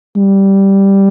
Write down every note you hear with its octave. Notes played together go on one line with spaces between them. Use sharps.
G3